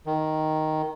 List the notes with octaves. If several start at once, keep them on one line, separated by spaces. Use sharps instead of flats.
D#3